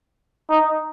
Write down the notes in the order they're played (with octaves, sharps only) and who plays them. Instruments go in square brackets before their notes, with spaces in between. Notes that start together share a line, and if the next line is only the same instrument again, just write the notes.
[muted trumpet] D#4